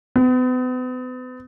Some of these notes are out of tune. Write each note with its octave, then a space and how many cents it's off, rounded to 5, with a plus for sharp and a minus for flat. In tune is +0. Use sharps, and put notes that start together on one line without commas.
B3 +40